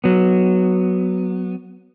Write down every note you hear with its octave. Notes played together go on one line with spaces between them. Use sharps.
F#3 B3